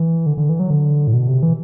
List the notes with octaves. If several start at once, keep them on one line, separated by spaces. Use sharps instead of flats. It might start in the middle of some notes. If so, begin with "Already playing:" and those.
Already playing: E3
D3
D3
E3
F#3
D3
A2
B2
C3
E3